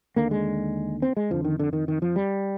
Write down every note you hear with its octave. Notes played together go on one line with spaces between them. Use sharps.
D#2 D3 A#3
G#3
C4
G#3
F2 D3 F3
D#3
D3
D#3
D#3
F3
G3